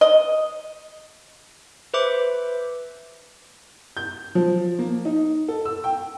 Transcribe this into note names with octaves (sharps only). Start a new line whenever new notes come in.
D#5
B4 C5 E5 D6
G6
F3
A#3
D#4
A4
E6
G5